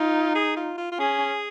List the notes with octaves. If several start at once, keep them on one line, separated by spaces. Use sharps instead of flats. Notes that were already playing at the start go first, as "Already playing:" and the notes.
Already playing: D#4 F4
G#4
F4
F4
F4
C#4 G#4